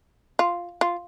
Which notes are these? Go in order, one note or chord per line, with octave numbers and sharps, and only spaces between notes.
F4
F4